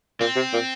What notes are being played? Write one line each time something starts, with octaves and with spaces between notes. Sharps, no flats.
A#2 C4
C3
A#2